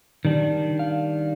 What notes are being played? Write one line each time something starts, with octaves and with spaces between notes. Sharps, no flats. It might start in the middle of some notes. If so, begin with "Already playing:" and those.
D#3 G3 D4
F5